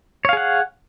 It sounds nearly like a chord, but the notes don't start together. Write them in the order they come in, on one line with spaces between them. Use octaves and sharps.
C#5 F5 G#4 F#5